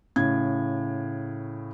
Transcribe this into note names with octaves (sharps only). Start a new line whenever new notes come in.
A2 C#3 G#6